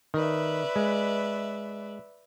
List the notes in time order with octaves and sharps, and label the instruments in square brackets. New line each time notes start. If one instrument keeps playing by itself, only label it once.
[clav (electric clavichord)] D#3 [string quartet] B4 D5 E5
[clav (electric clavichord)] G#3